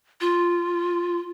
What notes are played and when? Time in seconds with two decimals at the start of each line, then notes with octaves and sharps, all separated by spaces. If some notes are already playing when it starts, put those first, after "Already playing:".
0.21 F4